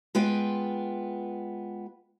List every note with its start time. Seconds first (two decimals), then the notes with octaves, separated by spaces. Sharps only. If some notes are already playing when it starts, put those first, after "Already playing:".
0.15 G#3 B3 F4 B4 G5